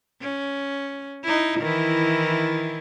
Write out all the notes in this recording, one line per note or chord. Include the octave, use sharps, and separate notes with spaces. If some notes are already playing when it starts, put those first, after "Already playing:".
C#4
D#4 E4
D#3 E3 E4